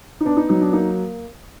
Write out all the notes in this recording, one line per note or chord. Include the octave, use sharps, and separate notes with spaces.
D#4
B3 D4
D#4
F#3 D#4
D4
A#3 D#4